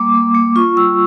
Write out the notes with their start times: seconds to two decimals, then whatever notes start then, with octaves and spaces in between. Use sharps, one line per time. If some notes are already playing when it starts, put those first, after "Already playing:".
Already playing: G3 A#3 D6
0.14 A#3
0.35 A#3
0.56 F4 C#6
0.77 G3 E6